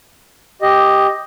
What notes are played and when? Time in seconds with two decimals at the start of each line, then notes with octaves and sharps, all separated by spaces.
0.62 G4 D#5